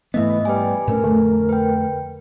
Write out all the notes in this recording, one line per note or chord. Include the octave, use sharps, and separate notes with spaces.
G#2 E3 A3 B3 D#5 E5
G3 B4 G#5
A2 A3 C#4 A#4
F2 D3 A3
B4 G5